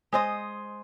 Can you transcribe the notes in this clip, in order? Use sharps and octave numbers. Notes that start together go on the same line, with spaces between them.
G#3 C5 D#5